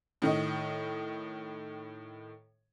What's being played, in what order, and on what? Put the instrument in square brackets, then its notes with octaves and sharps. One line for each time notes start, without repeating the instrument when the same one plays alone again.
[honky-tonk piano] A2 D#3 D#5